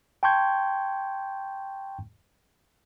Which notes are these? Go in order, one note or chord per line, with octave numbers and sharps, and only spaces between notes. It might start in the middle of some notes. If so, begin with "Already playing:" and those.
G5 A5 C6 C#6 G6 G#6